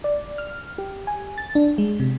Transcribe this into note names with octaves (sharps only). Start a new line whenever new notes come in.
D5
F6
G4
G#5
A6
D4
G#3
C3